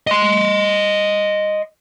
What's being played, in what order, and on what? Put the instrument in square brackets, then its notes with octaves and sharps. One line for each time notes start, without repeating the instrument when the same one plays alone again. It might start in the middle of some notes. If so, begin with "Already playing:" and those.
[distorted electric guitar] D#5 C6